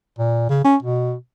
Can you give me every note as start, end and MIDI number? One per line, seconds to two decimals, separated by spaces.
0.19 0.46 46
0.50 0.61 49
0.65 0.76 61
0.82 1.14 47